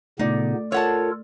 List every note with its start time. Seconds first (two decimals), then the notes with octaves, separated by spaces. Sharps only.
0.19 A#2 C#3 A3 B3 D#4 D5
0.72 F4 A4 A#4 C#5 F#5 A5